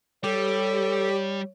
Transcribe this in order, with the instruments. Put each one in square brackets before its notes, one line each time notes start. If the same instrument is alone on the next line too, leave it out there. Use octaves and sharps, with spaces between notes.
[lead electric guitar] G3 [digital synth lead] G4 [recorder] A4 [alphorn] C#5